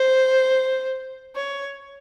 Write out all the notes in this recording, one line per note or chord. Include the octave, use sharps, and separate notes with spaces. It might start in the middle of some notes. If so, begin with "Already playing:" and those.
Already playing: C5
C#5